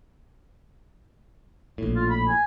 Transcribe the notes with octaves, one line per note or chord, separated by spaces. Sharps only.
A#1 A2
F4
B5
G#5